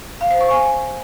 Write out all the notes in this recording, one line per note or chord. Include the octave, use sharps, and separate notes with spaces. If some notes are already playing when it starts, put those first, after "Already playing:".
F5
C5
C#6
G#5